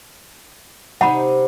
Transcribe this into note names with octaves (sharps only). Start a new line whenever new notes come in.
C3 D#4 F#5 B5